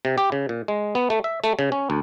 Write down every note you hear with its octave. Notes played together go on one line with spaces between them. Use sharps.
C3
G4
C#3
A#2
G#3
B3
A3
E5
A3
C#3
C#4
D2